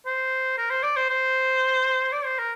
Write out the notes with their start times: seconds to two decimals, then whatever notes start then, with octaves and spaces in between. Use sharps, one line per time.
0.06 C5
0.58 A#4
0.71 C5
0.83 D5
0.97 C5
1.10 C5
2.13 D5
2.25 C5
2.39 A#4